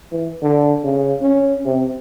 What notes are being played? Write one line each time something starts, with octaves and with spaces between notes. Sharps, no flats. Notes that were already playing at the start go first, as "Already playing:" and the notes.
E3
D3
C#3
C#4
C3